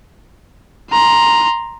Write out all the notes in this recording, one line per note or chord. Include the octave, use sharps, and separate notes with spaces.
A#5 C6